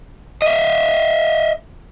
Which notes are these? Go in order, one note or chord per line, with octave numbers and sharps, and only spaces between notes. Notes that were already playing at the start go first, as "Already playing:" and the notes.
D#5 E5